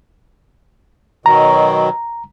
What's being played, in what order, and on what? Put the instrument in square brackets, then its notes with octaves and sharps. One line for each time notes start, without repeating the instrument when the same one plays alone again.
[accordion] B2 D#3 F#3 [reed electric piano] A#5